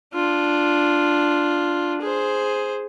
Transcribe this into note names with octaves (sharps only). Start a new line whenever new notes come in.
D4 F4
G#4 C5